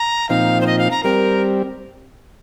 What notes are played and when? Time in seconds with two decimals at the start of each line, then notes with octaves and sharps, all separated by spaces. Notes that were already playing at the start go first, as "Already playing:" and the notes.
Already playing: A#5
0.29 A#2 F3 C4 D#4 F5
0.61 C5
0.67 D#5
0.79 F5
0.91 A#5
1.03 G3 C4 A#4